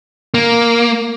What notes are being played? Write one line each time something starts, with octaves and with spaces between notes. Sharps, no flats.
A#3